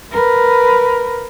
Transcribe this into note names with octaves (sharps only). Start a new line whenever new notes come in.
A#4 B4